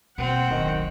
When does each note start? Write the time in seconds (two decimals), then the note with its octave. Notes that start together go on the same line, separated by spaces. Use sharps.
0.18 B2 A#3 C4 F#5 G5
0.51 D1 B1 D#3 D#4 D#5